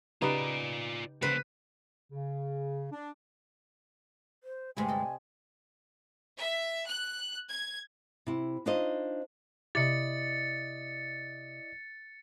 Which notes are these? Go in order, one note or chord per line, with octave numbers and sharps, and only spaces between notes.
C#3 D#4 F4 G4 B4 D5
C#3 A#3 B4 C5
C#3
D4
C5
D2 G2 C3 G3 G#3 G#5
A4 D#5
E5
F#6
G#6
C3 E4
D4 D#4 F4 C5 D#5
C3 E4 D5 D#5 A6 C#7